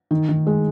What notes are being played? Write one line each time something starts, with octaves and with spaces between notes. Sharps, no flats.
D#3
D#3
G#3